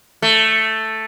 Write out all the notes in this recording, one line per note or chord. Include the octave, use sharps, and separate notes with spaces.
A3